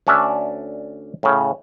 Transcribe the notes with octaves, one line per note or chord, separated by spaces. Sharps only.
D2 C#4 D4 D5 E5
A2 C#3